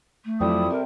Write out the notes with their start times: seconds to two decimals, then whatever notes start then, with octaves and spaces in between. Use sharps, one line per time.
0.25 A3
0.40 F2 F#3 G3 C4 E4 F4 A4 D#6
0.71 C3 A#4